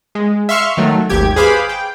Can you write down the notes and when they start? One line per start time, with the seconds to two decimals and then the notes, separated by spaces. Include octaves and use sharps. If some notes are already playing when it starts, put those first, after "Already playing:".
0.15 G#3
0.49 E5 F5 C6 C#6 F6
0.77 D#3 F#3 A3
1.10 G#1 D#2 G4 G#6
1.36 G#4 B4 C5 F5 B5 D6
1.69 G5